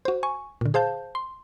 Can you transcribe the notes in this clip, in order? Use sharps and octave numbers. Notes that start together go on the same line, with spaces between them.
F#4 C5
G#5 C#6
A#2 D3
G#4 C5 F5 A5 G6
C6